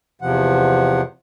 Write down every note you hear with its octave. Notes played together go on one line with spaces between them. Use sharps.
E2 C3 F3 F#5